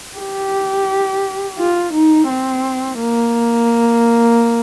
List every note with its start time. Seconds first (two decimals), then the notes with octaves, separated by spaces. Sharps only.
0.17 G4
1.58 F4
1.93 D#4
2.29 C4
2.99 A#3